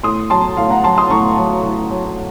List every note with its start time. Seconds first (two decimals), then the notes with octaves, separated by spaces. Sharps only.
0.03 A2 C6 D#6
0.30 F#3 A5 C6
0.57 A2 F5 A5
0.70 F#5 A#5
0.84 F#3 A5 C6
0.98 C6 D#6
1.11 A2 A#5 C#6
1.38 F#3
1.65 A2
1.91 F#3